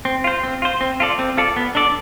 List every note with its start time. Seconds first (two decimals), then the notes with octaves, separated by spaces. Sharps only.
0.05 C4
0.24 F4 C5
0.43 C4
0.62 F4 C5
0.81 C4
1.00 F4 A4 D5
1.19 C4
1.37 F4 A4 D5
1.56 B3
1.75 D4 A4 D5